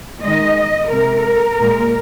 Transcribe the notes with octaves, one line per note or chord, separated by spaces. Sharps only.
D#3 G#3 D#5
C3 G#3 A#4
A#2 G#3